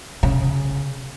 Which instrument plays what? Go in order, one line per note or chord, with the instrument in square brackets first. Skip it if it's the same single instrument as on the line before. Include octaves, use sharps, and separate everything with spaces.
[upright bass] C#3